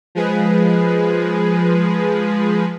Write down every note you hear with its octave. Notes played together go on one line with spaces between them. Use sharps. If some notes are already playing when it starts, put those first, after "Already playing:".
F3 G#3 G#4 B4